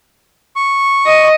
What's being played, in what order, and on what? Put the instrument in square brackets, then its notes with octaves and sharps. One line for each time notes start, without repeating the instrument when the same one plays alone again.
[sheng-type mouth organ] C#6
[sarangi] D#5